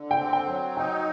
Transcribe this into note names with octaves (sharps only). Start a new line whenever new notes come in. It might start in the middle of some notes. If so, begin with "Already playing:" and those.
Already playing: D3
G5
C4
G5
F#3
D#4 G5